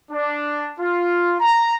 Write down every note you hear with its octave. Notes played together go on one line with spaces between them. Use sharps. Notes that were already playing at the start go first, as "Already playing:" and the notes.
D4
F4
A#5